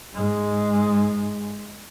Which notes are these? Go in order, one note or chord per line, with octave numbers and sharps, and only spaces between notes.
G#2 G#3